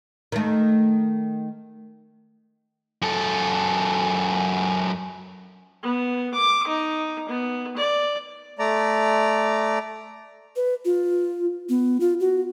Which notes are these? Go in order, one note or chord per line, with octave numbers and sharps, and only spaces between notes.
D#3 A3
F#2 A4
B3
D6
D#4
B3
D5
A3 D5 A#5
B4
F4
B3
F4
F#4